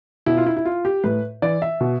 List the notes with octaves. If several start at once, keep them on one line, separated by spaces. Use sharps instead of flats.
B2 E4
F4
E4
E4
F4
G4
A2 B4
E3 D5
E5
B2